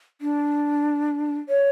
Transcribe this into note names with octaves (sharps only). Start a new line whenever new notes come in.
D4
C#5